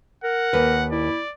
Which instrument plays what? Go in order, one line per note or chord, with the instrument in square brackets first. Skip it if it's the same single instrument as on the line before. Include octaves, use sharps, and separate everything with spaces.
[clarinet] A#4 [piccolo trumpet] F#5
[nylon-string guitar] D#2 B4
[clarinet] E4 [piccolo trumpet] D5